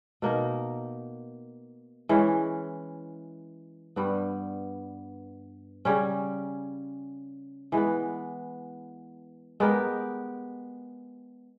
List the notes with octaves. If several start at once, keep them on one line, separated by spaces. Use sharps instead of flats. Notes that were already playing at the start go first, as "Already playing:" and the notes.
B2 A#3 D#4 A#4
E3 G#3 C#4
G2 G3 B3
C#3 G3 C#4
E3 G#3 B3
G#3 B3 G4 A#4